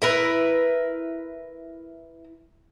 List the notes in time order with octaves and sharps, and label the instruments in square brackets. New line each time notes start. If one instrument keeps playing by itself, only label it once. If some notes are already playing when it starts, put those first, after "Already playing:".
[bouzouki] E4 A#4 B4